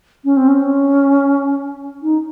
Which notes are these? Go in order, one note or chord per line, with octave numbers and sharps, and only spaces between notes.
C#4
C4
C#4
D#4